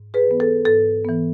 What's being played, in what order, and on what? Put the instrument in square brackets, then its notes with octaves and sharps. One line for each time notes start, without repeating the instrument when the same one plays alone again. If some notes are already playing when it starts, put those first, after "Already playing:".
Already playing: [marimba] G#2
G#4 B4
E3 B3
A4
G#2 A4
E3 B3